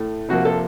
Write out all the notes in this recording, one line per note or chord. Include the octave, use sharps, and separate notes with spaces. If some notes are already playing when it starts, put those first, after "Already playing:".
Already playing: A2 A3
C3 F3 A#3 F#4
A4